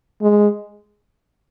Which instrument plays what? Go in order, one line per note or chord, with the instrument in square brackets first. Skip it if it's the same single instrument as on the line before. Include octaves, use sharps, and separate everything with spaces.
[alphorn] G#3